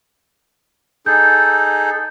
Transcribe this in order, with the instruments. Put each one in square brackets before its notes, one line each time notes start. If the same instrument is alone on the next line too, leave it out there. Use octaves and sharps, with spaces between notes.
[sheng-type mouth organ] D#4 G#4 A4 [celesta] G6